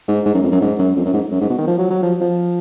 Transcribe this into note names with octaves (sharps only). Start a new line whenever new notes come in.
G#2
G#2
F#2
F2
F#2
G#2
F#2
F2
F#2
G#2
F#2
G#2
B2
D#3
F3
F#3
F#3
F3
F3